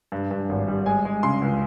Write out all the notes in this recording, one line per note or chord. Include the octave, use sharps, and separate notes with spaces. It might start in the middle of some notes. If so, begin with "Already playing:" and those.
G2
G2
G#1
G3
G#3 G#5
G#3
C#3 C6
C#2